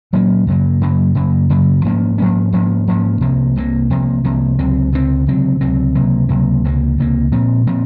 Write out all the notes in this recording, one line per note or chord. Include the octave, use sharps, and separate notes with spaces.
A#2 F#3 A#3 C#4
F#2 C#3 F#3 A#3
F#2 C#3 F#3 A#3
F#2 C#3 F#3 A#3
F#2 C#3 F#3 A#3
G#2 F3 A#3 C#4
G#2 F3 A#3 C#4
G#2 F3 A#3 C#4
G#2 F3 A#3 C#4
C2 C3 F3 A#3
C2 C3 F3 A#3
C2 C3 F3 A#3
C2 C3 F3 A#3
C#2 C3 F#3 C4
C#2 C3 F#3 C4
C#2 C3 F#3 C4
C#2 C3 F#3 C4
C#2 C3 F#3 A#3
C#2 C3 F#3 A#3
C#2 C3 F#3 A#3
C#2 C3 F#3 A#3
A#2 F3 C4
A#2 F3 C4